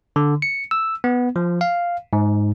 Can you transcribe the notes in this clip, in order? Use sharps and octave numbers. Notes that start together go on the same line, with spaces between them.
D3
C#7
E6
B3
F3
F5
G#2